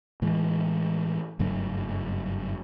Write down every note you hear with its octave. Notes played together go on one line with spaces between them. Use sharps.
A2 E3 G#3
F#1 G2 F#3 A3